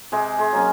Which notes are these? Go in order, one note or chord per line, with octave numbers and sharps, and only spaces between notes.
C3 G#3 G#4
G#3 G#4
F#3 A#3 C#4